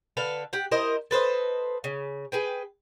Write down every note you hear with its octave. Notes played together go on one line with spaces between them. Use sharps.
D3 A4 B4 F5
G4 F#5
E4 A#4 C5 D#5
A4 B4 C5 D#5
C#3
G#4 B4 G5